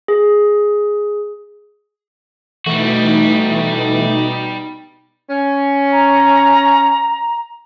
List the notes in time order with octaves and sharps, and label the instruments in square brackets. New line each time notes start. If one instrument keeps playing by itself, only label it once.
[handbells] G#4
[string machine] B2 D#4 [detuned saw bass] E3 [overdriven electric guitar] G3 F#4 [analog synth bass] A3
[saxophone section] C#4
[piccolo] A#5